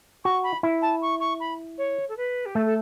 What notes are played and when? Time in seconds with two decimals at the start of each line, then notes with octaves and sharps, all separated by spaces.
0.24 F#4 C#6
0.44 B5
0.63 E4
0.82 A5
1.02 C#6
1.20 C#6
1.40 B5
1.78 C#5
2.09 A4
2.17 B4
2.46 G4
2.55 A3 A4
2.66 A4